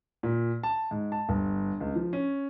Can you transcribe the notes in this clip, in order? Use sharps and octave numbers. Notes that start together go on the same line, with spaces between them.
A#2
A5
G#2
A5
G1
C#2
F3
C#4